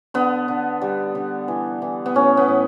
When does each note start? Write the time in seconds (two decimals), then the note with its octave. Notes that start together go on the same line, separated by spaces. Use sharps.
0.14 D3 B3
0.48 D3
0.82 G3
1.15 D3
1.48 E3
1.82 E3
2.06 B3
2.15 A2 C#4
2.37 B3
2.48 A2